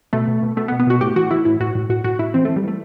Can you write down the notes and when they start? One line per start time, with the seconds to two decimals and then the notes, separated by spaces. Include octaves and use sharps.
0.13 B2 A3
0.28 B2
0.43 B2
0.57 B2 A3
0.68 B3
0.72 B2
0.79 B3
0.87 B2 F#4
1.01 A2 G4
1.16 E3 F#4
1.31 E3 E4
1.45 A2 E4
1.60 A2 F#4
1.75 A2
1.89 A2 F#4
2.04 A2 F#4
2.19 A2 E4
2.34 E3 C4
2.45 E3 A3
2.56 G3
2.64 E3 A3